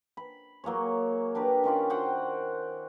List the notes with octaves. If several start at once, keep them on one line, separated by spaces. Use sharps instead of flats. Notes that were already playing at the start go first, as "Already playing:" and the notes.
B5
F#3 A#3 G#4 C#5
D4 G4 A#4 B4
D#3 C#4 F4 D5
F#4 C5 F#5 G5